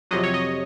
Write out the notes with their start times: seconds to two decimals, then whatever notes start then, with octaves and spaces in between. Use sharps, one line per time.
0.11 F2 C3 F#3 D#5
0.24 C#5
0.34 D#5